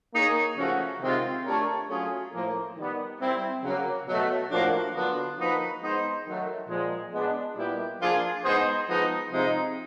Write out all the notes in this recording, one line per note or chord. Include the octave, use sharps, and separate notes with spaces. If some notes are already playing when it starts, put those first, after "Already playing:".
A#3 D#4 G#4 C#5
C#3 F3 A3 C#4 F#4
C3 D#3 G#3 C4 F4
A3 D4 G4 A#4 C#5
F#3 A3 C#4 F4 G#4
A2 F3 A#3
D#3 G3 B3
G3 C4 E4
C#3 F#3 A#3
B2 F#3 A3
A2 F3 A#3 D4 F#4
D3 F#3 B3 D4 F4
F3 A#3 D#4 F#4 B4
G#3 B3 D#4 G#4 C5
D#3 F#3 A3
A#2 F3 G#3
G#3 B3 D4
A#2 G3 B3 E4 G4
F3 A#3 D4 F4 G#4
G#3 B3 D#4 G#4 C5
F3 G#3 B3 D#4
C3 F3 G#3 C4 D#4